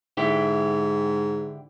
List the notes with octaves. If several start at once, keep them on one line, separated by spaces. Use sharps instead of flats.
G#2 D3 E4 G4